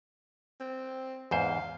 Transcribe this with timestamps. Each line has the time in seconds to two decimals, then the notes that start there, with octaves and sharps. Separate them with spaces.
0.60 C4
1.31 E2 G#2 C5 F5